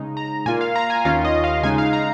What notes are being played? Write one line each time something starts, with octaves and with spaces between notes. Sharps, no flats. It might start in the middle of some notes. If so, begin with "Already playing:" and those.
Already playing: C#3 G#3 D#4
A#5
A#2 A#3 F4 G#5
F5
A#5
G#5
D#2 D#3 C#4 F4 F5
D#5
F5
C#3 G#3 D#4 G#5
F5
A#5